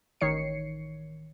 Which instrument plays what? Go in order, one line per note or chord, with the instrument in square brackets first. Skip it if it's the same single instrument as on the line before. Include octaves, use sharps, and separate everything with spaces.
[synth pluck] A1 D#3 C#5 C7 C#7